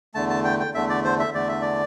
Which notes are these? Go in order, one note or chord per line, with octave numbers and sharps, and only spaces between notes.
E2 D3 A3 A5
A5
G5
G5
E2 D3 A3 E5
D5
C5
E5
E2 D3 A3 D5
E5
D5